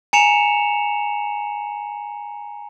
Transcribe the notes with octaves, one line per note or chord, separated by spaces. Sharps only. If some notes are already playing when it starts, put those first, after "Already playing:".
G#5 A#5 C#7 E7 F7